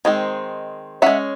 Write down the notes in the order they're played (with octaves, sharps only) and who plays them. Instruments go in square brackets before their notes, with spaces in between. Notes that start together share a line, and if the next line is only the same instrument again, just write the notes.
[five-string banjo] D#3 G#3 C4
G#3 C#4 E5 F#5